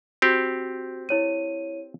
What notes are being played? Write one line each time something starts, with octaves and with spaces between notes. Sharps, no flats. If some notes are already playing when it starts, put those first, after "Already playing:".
C4 F#4 G4
E4 C#5 D#7